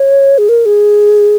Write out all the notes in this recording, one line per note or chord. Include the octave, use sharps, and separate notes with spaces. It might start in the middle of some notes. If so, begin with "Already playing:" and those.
Already playing: C#5
G#4
A#4
G#4